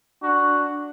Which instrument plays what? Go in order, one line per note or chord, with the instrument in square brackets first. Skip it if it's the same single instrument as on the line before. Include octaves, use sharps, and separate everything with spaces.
[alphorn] D4 [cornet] F#4